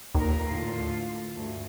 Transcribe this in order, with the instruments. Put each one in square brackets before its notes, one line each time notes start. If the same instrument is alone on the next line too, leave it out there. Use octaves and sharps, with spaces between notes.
[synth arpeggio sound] D#2 [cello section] A#2 A#4
[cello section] A2 D3 F4
D2 G2